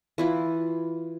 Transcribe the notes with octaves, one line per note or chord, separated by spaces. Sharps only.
E3 E4 F4